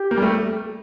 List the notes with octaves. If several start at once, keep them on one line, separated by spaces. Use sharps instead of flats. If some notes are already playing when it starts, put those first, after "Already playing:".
Already playing: G4
A#3
G3
A3